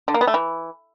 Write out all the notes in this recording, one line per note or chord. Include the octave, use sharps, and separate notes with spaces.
D3
A#3
B3
A3
E3